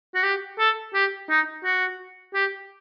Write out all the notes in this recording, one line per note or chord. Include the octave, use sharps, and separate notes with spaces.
F#4
G4
A4
G4
D#4
F#4
G4